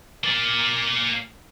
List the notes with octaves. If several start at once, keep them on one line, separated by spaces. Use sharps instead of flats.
A#3 D5